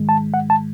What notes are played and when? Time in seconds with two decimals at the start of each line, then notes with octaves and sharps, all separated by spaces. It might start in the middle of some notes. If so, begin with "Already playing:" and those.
Already playing: G#2 D#3 G#3
0.09 A5
0.34 F#5
0.50 A5